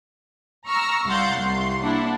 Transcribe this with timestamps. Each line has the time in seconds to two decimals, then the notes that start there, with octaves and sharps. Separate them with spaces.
0.67 A#5 C#6 E6 F6 A#6
1.06 C2 F5 F#5 C6 G6 A6
1.35 C2 C6
1.82 A#3 D4 E4 F#5